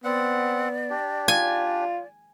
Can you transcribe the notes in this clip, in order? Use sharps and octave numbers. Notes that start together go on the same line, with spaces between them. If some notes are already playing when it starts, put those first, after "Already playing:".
B3 C4 D5 F#5
D4 G4
F4 G#5